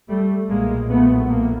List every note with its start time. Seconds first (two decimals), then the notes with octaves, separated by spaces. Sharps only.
0.09 G3 A3
0.49 B1 A#2 G#3 A#3
0.90 A3 B3
1.30 A#3